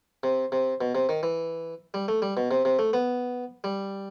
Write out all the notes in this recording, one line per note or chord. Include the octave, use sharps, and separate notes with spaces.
C3
C3
B2
C3
D#3
E3
G3
A3
G3
B2
C3
C3
A3
B3
G3